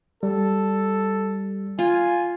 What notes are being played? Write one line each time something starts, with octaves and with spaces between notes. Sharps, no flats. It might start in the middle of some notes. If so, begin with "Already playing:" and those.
G3 A4
F4 G#5